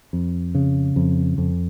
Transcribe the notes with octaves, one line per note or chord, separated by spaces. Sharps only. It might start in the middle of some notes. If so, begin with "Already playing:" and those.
F2
C#3
F2
F2